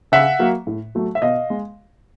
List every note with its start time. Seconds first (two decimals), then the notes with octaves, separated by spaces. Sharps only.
0.12 C#3 E5 F#5
0.39 F#3 A#3
0.67 A2
0.95 F#3 A3
1.15 E5
1.22 B2 D#5 F5
1.50 G#3